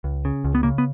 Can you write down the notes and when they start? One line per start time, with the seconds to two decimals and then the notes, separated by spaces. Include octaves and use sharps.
0.04 C#2
0.25 C#3
0.45 C#2
0.55 B3
0.63 C#3 A#3
0.78 B3